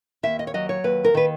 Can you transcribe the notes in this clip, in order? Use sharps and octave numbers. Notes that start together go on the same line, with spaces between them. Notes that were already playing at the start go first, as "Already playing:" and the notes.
D#2 E5
D#5
C#5
F#3 D#5
C#5
D#2 B4
A#4
D#3 B4